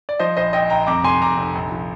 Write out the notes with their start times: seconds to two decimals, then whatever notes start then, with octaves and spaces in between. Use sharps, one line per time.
0.09 D5
0.19 F3 C5 D#5
0.37 A#1 C5 D#5
0.53 A#1 D#5 G5
0.70 A#1 G5 A#5
0.87 F2 A#5 D6
1.04 F1 G#5 C6
1.21 F1 A#5 D6
1.38 F1
1.55 A#1
1.72 F3